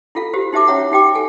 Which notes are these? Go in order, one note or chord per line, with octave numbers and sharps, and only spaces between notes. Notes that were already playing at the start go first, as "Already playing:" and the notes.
E4 F4 A4 F5
F#4 G4 C5
D#4 G4 C5 E5 A5 D6
C#4 C#5 E5 F#5 A#5
D#4 G4 G5 D6
A4 G#5